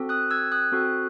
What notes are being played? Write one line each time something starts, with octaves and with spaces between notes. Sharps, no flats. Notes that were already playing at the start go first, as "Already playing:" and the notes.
Already playing: C4 F#4 A4
D#6 F#6
E6 G#6
D#6 F#6
C4 F#4 A4